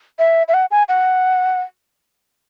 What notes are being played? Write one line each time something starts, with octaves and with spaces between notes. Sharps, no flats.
E5
E5
F#5
G#5
F#5